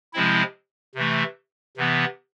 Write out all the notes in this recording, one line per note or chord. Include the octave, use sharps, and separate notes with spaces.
C3 F3 G#3 C4 E4
C3 E3 A3
C3 E3 B3